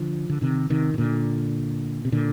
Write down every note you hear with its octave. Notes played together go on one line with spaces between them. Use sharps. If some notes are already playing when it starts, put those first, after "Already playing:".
Already playing: D3 F3
D3
C3 D#3
C3 D#3
C3
A#2 D3
C3
A#2 D3